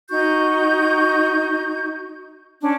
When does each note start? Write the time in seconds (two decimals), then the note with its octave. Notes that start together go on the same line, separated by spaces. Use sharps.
0.09 D#4 F#4 C#6 G6
2.61 C#4 D4